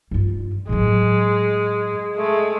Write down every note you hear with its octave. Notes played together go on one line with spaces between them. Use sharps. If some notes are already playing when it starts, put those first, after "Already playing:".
G2 F4
A2 F#3 G#3
G#3 A3